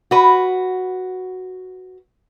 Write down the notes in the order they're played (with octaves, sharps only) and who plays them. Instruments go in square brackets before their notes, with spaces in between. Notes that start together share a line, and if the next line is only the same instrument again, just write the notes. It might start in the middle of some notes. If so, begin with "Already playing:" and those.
[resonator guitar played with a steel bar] F#4 B4